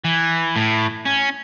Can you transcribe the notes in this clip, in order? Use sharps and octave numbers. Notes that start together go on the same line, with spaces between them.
E3
A2
C#4